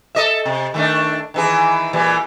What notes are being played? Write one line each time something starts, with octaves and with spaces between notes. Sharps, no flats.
A4 D#5 E5
C3
D#3 A3 D4
D#3 E3 G#4
A#2 E3 G3